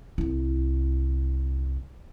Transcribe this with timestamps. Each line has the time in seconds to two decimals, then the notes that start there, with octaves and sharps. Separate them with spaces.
0.18 C2 E4